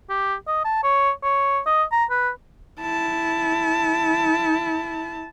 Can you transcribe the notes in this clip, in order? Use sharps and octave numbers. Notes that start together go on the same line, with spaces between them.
G4
D#5
A5
C#5
C#5
D#5
A#5
B4
E4 A5